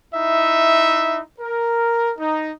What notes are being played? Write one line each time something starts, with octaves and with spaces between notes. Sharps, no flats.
D#4 E4 E5
A#4
D#4